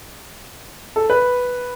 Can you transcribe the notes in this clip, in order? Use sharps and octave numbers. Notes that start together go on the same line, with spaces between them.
A4
B4